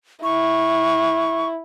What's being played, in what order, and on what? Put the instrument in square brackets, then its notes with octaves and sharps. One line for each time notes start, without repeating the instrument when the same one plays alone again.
[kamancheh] E4 [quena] C#6